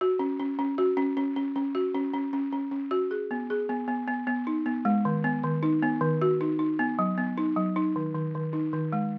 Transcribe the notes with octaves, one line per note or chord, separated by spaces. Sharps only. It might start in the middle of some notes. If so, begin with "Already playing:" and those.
F#4
C#4
C#4
C#4
F#4
C#4
C#4
C#4
C#4
F#4
C#4
C#4
C#4
C#4
C#4
F#4
G#4
B3
G#4
B3
B3
B3
B3
D#4
B3
G#3
D#3
B3
D#3
D#4
B3
D#3
F#4
D#4
D#4
B3
F#3
B3
D#4
F#3
D#4
D#3
D#3
D#3
D#4
D#3
G#3